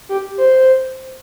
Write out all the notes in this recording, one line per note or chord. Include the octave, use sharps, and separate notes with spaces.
G4
C5